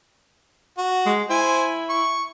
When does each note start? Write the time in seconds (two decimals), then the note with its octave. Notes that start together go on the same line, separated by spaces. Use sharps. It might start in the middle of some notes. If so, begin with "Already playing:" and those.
0.78 F#4
1.06 G#3
1.30 E4 C5 G#5
1.89 C#6